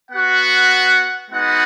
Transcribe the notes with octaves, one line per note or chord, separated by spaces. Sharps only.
B3 F#4 F#5
G#3 B3 D#4 F#4 F#5